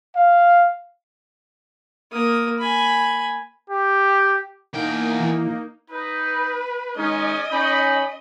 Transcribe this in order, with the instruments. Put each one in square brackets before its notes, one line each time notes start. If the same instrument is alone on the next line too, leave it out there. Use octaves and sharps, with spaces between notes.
[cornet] F5
[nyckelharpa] A#3 D#6
G#5 B5
[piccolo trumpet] G4
[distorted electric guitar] E2 G5 [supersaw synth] A#3 D#4
[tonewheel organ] E3
[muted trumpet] D#4 [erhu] B4
[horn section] D#3 G#3 D#4 [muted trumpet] C#4 [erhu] D#5
[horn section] C#4 B5 [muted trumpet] D#4